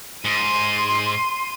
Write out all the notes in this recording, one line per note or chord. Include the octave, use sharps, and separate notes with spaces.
G#2 C6 D#7